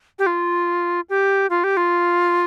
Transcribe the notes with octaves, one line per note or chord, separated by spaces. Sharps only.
G4
F4
G4
F4
G4
F4